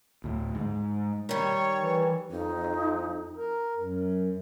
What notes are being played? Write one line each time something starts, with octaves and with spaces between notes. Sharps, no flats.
D2 A2
G#2
D#3 G3 C#5
E3
F2 D#4
A#4
F#2